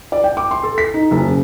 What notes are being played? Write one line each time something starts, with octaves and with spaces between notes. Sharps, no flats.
D5
G5
D6
C6
A4
B6
D#4
F#1
C#3